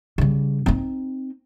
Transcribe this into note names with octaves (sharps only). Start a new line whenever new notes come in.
C#3 G3
C4 D#4